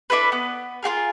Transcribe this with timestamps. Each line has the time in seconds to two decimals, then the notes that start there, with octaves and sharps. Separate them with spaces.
0.10 D4 E4 A4 B4
0.32 B3
0.83 F4 F#4 G#4 A#4